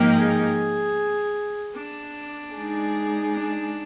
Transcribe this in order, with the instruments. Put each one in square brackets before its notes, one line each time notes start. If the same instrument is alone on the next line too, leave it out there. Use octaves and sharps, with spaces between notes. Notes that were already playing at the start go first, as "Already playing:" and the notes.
Already playing: [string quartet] G#2 F3 A#3 D#4 G4
[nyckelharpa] G#4
D4
[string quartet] G#3 D#4 G#4 D5
[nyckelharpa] D4